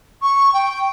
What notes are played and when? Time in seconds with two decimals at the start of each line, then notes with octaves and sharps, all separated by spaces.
0.22 C#6
0.53 G5